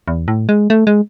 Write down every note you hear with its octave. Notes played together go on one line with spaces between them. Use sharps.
E2
A2
G#3
A3
G#3